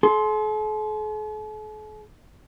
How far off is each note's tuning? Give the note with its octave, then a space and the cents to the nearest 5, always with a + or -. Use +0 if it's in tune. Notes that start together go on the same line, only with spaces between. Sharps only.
A4 -45 C6 +0